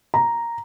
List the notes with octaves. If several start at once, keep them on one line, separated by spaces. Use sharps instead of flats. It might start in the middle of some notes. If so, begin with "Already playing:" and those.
A#5